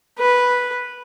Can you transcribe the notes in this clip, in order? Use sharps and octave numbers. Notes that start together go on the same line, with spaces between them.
B4